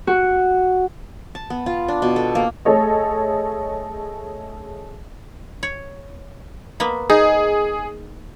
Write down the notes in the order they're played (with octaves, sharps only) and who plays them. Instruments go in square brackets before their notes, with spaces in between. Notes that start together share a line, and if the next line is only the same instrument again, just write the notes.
[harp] F#4
[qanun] A5
B3
F4
D4
B2
A4
A#3
[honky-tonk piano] A3 G#4 A4 C#5 D#5
[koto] C#5
A#3 B3 B4
[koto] D#4 [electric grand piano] G#4